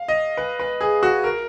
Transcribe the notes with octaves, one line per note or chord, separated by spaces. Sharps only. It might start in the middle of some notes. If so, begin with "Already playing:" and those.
Already playing: F5
D#5
B4
B4
G#4
F#4
A#4